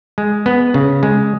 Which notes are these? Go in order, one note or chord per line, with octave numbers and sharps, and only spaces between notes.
G#3
B3
C#3
G#3